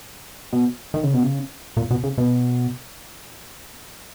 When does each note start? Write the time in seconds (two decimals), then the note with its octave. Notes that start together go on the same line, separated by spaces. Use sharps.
0.53 B2
0.94 D#3
1.03 C#3
1.13 B2
1.23 C#3
1.77 A#2
1.91 B2
2.03 C#3
2.18 B2